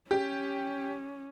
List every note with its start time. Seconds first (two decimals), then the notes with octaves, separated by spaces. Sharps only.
0.11 C#4 G4